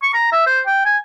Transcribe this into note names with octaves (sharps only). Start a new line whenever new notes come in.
C#6
A#5
E5
C5
G5
G#5